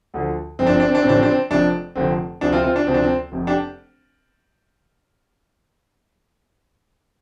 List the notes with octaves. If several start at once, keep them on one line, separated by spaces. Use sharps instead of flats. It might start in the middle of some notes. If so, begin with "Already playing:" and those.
D2 D3 F3
G1 F2 F3 C4
D4
C4
D4
C4
D4
C4
A1 A2 F3 D4
C4
D4
C4
F1 F2 F3 D4
F1 F2 D3 F3 C4
D2 C3 F3 D4
C4 F4
C4 F4
D4
D2 C3 F3 C4
D4
C4
F1 F2 C3
D4 G4